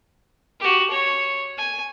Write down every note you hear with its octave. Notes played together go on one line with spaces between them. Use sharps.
F#4 G4
C#5
G#5